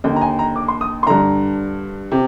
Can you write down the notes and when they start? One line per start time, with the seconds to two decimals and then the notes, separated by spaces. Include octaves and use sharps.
0.04 D#2 D3 G5
0.16 A#5
0.21 G#5
0.39 A#5
0.56 D6
0.68 C6
0.81 D#6
1.03 C6
1.06 G2 D3 A#5
2.12 C3